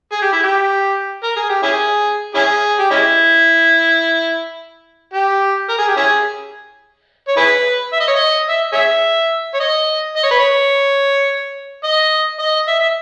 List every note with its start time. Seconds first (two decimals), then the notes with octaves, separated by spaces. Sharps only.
0.12 G#4
0.22 G4
0.33 E4
0.43 G4
1.23 A#4
1.36 G#4
1.49 G4
1.63 C#4 E4 G#4
2.35 C#4 E4 G#4
2.79 G4
2.91 G#3 C#4 E4
5.14 G4
5.69 A#4
5.78 G#4
5.88 G4
5.97 C#4 E4 G#4
7.28 C#5
7.37 E4 G#4 B4
7.93 E5
8.00 D#5
8.08 C#5
8.15 D#5
8.49 E5
8.72 G#4 C#5 E5
9.54 C#5
9.60 D#5
10.16 D#5
10.23 C#5
10.31 B4
10.39 C#5
11.84 D#5
12.39 D#5
12.68 E5
12.80 E5